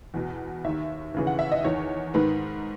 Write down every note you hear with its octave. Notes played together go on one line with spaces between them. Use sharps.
E2 B2
D#2 D#3 E5
D#2 C#3 E3
F#5
E5
D#5
E2 D#3 C#5
G#2 D#3 B4